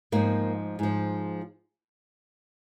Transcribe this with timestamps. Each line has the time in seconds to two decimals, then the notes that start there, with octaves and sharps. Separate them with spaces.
0.12 G#2 F3 A#3
0.79 G#2 F3